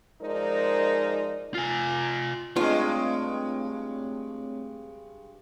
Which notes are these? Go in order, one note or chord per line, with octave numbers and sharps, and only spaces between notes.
F3 G#3 D#4 A#4 C5 D5
F4 G#5
G2 G#3 A3 C4 F4 C#5